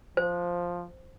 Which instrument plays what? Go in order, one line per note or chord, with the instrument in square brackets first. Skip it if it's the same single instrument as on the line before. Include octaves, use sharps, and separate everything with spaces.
[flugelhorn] F3 [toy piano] C5